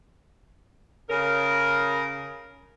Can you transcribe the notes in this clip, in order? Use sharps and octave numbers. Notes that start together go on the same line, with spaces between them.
C#3 A#4